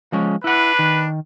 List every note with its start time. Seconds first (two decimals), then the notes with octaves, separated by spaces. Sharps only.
0.12 F3 G#3 C#4
0.44 D4 E4 B4 F#5
0.79 D#3